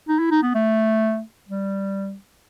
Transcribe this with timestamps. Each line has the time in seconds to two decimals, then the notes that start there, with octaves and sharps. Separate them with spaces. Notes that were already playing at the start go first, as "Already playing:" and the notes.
0.08 D#4
0.19 E4
0.31 D#4
0.43 B3
0.55 A3
1.49 G3